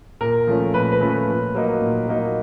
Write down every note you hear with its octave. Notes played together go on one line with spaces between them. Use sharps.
A#2 A#4
F3 A3 C#4
A#2 B4
B4
F3 A3 C#4
B4
A#2
F#3 A#3 D#4
A#2
F#3 A#3 D#4